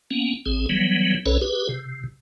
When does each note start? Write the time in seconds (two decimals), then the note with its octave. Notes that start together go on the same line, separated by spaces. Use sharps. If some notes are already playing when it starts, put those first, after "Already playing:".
0.11 A#3 B3 C#4
0.46 A1 C4 G#4
0.69 E3 F#3 G3 B3
1.26 B1 C#4 A4 B4 C#5
1.42 G4 G#4 B4
1.69 C3